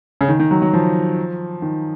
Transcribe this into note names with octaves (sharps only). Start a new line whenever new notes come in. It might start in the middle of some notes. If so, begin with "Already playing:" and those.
C#3
D#3
D#3
F#3
F#3
F3
D#3